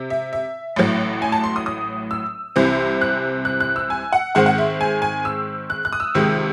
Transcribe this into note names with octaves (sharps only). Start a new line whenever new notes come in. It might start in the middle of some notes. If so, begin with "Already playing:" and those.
Already playing: C3
E5
E5
A1 A2 F#3
G#5
A5
C6
D#6
D#6
E6
C2 C3 E3 C4
F#6
F#6
F#6
E6
G#5
F#5
G#2 D#3 G#3 C4 F#5
F#5
E5
G#5
G#5
E6
F#6
F#6
D#6
E6
C#2 C3 D#3 G#3